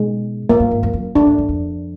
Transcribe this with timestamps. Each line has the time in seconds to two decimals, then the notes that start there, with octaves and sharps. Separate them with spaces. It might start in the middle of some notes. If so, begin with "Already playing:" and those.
Already playing: B2 G#3
0.49 A2 A#3
0.60 G2
0.71 G#2
0.83 F2
0.93 F#2
1.15 D3 D4
1.27 G#2
1.38 G2
1.49 F2